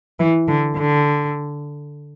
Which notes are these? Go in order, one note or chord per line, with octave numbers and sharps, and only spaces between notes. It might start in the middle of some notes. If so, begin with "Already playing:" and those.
E3
D3
D3